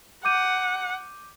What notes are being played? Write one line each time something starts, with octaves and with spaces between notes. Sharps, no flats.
F#5 D6 G6 D#7